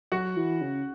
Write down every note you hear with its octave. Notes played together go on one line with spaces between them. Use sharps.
F#3 F#4 F#5
E3
C#3